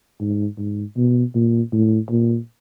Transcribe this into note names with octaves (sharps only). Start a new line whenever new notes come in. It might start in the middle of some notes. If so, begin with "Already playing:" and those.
G#2
G#2
B2
A#2
A2
A#2